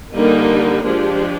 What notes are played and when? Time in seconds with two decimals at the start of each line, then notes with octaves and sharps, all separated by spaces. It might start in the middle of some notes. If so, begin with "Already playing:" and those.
0.14 D3 G3 A#3 D#4 A#4
0.84 F3 G#3 D4 G4